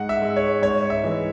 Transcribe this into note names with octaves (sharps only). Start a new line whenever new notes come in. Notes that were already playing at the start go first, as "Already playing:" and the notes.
Already playing: G#2 F#5
E5
G#3
C#5
G#2 C#5
E5
E3 G#3